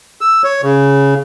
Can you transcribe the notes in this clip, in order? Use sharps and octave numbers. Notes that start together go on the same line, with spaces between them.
E6
C#5
C#3